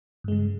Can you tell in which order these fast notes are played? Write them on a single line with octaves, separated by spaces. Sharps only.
G2 G#3 C#3